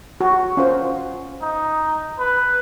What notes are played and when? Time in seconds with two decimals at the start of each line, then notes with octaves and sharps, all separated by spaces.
0.21 F#4
0.57 C#4 F4 C5
1.42 D#4
2.19 B4